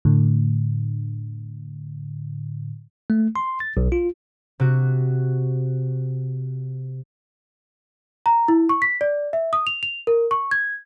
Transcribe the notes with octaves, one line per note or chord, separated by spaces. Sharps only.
A2 D3
A3
C6
A6
B1
F4
C3 F#4
A#5
E4
C#6
B6
D5
E5
D#6
F7
F7
A#4
C#6
G#6